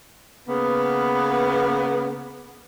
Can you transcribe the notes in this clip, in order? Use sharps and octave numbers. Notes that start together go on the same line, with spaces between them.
C#3 A#3 B3